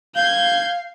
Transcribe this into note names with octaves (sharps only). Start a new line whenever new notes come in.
F5 G6 G#6